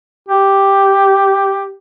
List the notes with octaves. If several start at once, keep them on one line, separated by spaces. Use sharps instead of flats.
G4